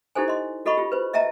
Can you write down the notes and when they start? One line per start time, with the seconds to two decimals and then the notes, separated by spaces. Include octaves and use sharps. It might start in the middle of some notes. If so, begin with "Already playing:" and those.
0.15 D#4 E4 G4 A4 C5 G#5
0.28 D#5 C6
0.66 F#4 A4 D#5 B5 C#6
0.78 F4 G4
0.92 B4 C5
1.13 D#5 E5 G5 A5 A#5